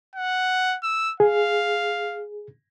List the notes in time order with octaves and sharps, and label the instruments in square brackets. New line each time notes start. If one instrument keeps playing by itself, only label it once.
[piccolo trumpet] F#5
E6
[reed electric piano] G#4 [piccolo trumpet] F5